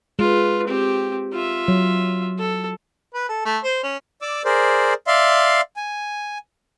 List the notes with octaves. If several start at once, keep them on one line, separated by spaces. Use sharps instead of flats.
G#3 F4 B4
C4 G4
F4 E5
F#3
A4
B4
A4
A3
C5
C#4
D5 D6 E6
G#4 A#4 C5 D5
D5 E5 F5 C6
G#5